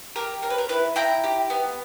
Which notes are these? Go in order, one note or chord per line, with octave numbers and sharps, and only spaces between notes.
G4 A#4
C#4 A#4
B4
A#4
E4 B4
E4 G5 A#5
G4
B3